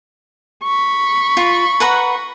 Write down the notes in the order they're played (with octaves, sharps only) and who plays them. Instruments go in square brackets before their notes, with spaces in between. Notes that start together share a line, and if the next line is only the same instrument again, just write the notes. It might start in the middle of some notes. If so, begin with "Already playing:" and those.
[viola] B5 C#6
[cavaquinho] F4
B4 F#5 A#5